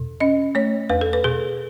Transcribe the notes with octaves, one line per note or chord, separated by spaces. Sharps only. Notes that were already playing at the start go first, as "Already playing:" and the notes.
Already playing: E2 B2
C#4 D#5
A3 C#5
E2 B4
A4
B4
B2 G#4